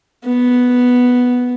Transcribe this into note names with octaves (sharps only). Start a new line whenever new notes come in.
B3